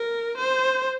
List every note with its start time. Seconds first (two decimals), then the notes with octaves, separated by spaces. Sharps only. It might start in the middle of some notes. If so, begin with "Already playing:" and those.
Already playing: A#4
0.38 C5